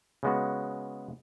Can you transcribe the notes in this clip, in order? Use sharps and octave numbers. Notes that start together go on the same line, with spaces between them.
C#3 G#3 B3 F#4